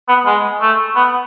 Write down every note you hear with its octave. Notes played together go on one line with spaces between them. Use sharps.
B3
G#3
A3
B3